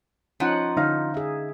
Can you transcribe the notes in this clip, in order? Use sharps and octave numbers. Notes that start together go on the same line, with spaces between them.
F3 C#4 D#4 F#5
D3 D#4 F5
G#4 E5